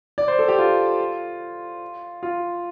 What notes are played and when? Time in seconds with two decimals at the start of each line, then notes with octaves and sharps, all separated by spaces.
0.18 D5
0.28 C5
0.39 A4
0.48 G4
0.59 F4
2.23 F4